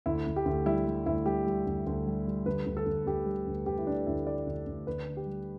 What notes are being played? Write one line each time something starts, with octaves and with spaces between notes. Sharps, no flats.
D2 E4
D2
G4
D2
G3 E4
G3
D2 E4
G3 G4
G3
D2
D2
G3
G3
D2 B4
D2
A4
D2
D2 G4
G3
D2
D2 G4
E4
D3 D4
D2 E4
D3 D5
D2
D2
D2 B4
D3
G4
G3